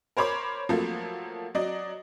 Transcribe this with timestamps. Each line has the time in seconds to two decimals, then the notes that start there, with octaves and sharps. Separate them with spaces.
0.17 A#4 C5 C#5 B5 D6
0.69 F3 F#3 A3 A#3 A4
1.55 F#3 D5 D#5